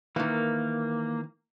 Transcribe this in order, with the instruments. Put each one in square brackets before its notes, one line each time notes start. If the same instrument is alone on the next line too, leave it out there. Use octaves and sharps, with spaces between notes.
[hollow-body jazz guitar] D#3 E3 [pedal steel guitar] A#3